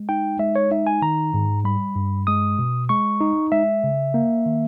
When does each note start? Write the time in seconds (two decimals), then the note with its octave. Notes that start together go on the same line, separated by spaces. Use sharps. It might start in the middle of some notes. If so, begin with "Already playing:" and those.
Already playing: G#3
0.09 D#4 G5
0.39 G#3 E5
0.56 C#5
0.71 D#4 E5
0.87 G#5
1.02 D#3 A#5
1.34 G#2
1.64 G3 B5
1.96 G2
2.27 G#3 D#6
2.59 B2
2.89 G#3 C#6
3.20 D#4
3.52 G#3 E5
3.84 C#3
4.14 A#3
4.46 D#3